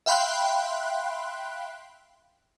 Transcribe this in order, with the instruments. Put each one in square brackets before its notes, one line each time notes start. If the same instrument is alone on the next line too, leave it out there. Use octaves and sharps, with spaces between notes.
[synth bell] E5 F5 G5 B5 C6 F#6